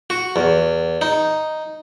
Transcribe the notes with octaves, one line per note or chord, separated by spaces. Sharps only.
F#4
E2
D#4